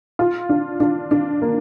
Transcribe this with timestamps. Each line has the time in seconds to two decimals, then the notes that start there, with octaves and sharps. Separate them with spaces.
0.19 F4
0.49 D4
0.80 D4
1.11 D4
1.42 A#3